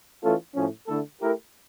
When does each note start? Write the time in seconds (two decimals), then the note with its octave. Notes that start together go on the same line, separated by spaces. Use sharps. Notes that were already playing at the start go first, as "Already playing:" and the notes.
0.22 E3 A3 C#4 F4 A4
0.54 A2 F3 C#4
0.87 D3 A3 E4 A4
1.20 A3 E4 G4 A#4